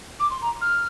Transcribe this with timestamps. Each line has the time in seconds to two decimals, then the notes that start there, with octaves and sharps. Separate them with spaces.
0.19 D6
0.30 C6
0.41 A#5
0.61 F6